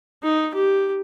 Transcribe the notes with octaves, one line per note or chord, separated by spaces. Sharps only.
D#4
G4